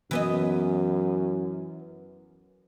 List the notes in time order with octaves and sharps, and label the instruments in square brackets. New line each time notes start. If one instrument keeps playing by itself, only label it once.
[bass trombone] F#2 [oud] E3 B3 D#5